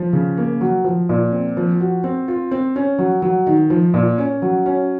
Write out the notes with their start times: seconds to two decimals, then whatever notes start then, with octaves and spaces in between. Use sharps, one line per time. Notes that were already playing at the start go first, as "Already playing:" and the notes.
Already playing: F3
0.13 C#3
0.37 A#3
0.61 F#3
0.84 F3
1.09 A#2
1.32 C4
1.57 F3
1.80 F#4
2.04 C4
2.28 F4
2.51 C4
2.76 C#4
2.98 F#3
3.22 F#3
3.47 D#3
3.70 F3
3.94 A#2
4.18 C#4
4.42 F#3
4.66 C#4